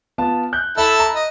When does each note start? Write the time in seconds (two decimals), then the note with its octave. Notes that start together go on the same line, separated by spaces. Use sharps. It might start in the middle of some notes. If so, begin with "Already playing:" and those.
0.18 B3 F4 A5
0.53 F#6 G6
0.77 E4 A4 E5 A5
1.00 A#5
1.15 D#5